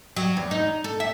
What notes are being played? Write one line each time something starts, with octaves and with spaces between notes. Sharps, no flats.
F#3
E2
D#4
A4
E5